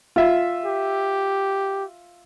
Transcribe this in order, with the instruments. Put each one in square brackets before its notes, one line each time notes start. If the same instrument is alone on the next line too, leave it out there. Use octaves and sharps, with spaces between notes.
[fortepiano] F4 E5
[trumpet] G4